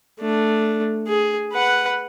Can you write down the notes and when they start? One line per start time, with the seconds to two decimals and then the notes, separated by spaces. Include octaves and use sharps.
0.20 A3 D4
1.08 G#4
1.53 B4 F#5